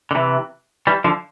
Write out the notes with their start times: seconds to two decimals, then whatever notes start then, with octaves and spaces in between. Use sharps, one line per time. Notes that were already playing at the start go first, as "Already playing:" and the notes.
0.11 D3
0.15 C3 E3
0.87 E3 G3
1.04 D3 F3